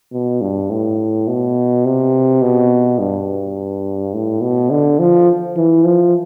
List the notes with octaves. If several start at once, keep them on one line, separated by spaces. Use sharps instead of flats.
B2
G2
A2
B2
C3
B2
G2
A2
B2
D3
F3
E3
F3